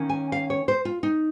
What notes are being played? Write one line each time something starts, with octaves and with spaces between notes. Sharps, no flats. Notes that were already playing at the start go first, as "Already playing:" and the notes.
Already playing: D#3 A#3 C#4
G#5
F5
C#5
C5
F4
D#4